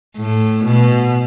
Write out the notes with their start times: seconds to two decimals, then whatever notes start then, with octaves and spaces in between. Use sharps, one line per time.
0.17 A2
0.64 B2